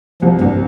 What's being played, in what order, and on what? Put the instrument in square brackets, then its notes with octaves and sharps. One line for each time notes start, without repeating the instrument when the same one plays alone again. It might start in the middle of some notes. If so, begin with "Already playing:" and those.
[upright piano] C2 [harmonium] F3
[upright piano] C2 [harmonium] G2